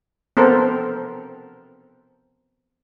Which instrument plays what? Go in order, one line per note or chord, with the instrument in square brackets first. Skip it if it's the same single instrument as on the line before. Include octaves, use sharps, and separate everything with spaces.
[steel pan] B3 C4 A4 A#4 C5